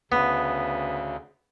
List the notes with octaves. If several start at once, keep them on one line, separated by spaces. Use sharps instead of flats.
D2 C#3 B3